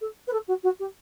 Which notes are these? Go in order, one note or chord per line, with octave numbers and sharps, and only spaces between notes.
A4
B4
A4
F#4
F#4
G4